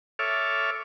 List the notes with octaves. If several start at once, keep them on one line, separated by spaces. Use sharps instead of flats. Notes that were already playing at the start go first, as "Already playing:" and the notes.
A4 C#5 E5 D6 F6